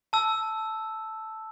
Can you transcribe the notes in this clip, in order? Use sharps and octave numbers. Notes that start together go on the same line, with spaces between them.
A5 E6